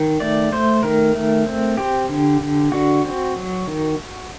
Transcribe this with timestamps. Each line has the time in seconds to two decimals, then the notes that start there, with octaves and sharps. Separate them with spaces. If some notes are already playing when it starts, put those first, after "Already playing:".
Already playing: D#3
0.20 A3 D5
0.52 A3 C5
0.83 D#3 A#4
1.15 A3
1.47 C4
1.77 C4 G4
2.09 D3
2.40 D3
2.72 D3 F#4
3.04 C4
3.36 F#3
3.67 D#3